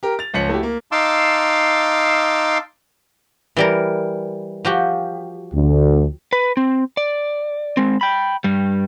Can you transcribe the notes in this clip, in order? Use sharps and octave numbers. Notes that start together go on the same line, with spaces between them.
G4 A#4
A6 F7
C#2 F3 C#5 B6 C#7 F#7
A3 E4 F#4 G4
A#3
D#4 F5 A5 C6 D6 E6
E3 G3 A#4
F3 F#4 G4
D2
B4
C4
D5
G#3 C4
G5 B5
G2 G3